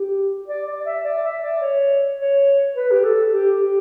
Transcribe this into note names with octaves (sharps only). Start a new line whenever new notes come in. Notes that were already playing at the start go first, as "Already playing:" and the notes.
Already playing: G4
D5
D5
E5
D5
E5
D5
C#5
C#5
B4
G4
A4
G4
G4